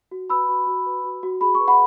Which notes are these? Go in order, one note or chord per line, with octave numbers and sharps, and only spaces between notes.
F#4
B4 B5 E6
F#4
F#4
B4
F#4
F#4
G#4 B5
B4 C#6
F#5 B5